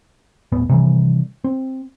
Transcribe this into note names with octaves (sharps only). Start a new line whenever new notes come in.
D#1 A2 B3
C3 D#3 E3 G3
C4